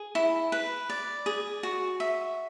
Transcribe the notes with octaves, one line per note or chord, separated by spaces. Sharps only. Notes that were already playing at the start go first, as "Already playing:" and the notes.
Already playing: G#4
E4
B4
D5
G#4
F#4
E5